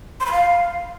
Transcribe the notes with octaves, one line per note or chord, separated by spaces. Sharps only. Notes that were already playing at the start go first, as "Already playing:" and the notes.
C6
B5
F5